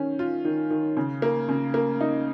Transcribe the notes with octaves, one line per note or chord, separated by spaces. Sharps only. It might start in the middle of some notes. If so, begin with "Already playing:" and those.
Already playing: D#3 C#4
F4
D#3
D#3
C#3
A#3
C#3
A#3
D#4